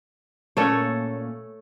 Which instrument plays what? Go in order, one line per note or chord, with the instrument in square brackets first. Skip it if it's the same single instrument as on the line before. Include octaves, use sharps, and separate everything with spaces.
[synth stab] A#2 A#3 C#4 [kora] A3 A4 C#5